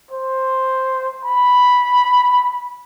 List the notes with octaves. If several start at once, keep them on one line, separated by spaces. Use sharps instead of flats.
C5
B5